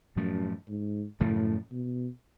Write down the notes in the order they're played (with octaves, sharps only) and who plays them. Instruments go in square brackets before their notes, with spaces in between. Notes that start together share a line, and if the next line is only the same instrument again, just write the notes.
[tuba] F#2 [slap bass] A2 F3 A3
[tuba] G#2
[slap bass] F#2 C#3 F3 A3 [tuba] A2
[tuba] B2